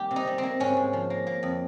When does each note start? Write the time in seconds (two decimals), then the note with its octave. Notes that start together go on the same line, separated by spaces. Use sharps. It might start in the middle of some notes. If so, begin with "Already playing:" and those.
Already playing: D#3 G3 A#3 G4
0.11 C3
0.16 D#4
0.27 G3
0.38 C4
0.43 A#3
0.60 G#2 C#4
0.77 G#2
0.93 F3
1.10 A#3
1.27 A#3
1.43 F2